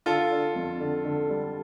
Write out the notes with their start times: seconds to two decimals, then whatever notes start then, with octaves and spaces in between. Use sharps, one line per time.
0.06 D3 F4 A4
0.31 D4
0.55 F2
0.80 D3
1.04 D3
1.30 G3